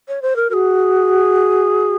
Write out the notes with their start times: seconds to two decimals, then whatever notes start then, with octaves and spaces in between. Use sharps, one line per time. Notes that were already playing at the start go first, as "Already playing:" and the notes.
0.08 C#5
0.22 C5
0.36 A#4
0.50 F#4 G#4 A#4